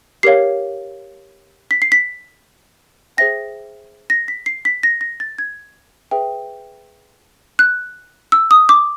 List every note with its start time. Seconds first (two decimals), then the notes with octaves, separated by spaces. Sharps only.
0.23 G4 A#4 C#5 F5 C7
1.71 B6
1.82 C7
1.92 B6
3.17 G#4 C5 E5 G5 A#6
4.10 A#6
4.28 B6
4.46 C7
4.65 B6
4.83 A#6
5.01 A#6
5.20 A6
5.38 G#6
6.11 G#4 B4 E5 G5
7.59 F#6
8.32 E6
8.51 D#6
8.69 D6